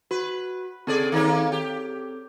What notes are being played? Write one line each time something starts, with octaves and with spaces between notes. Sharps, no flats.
F#4 B4
C#3 C4 G#4 A4 D5
D#3 A#3 C#4
G4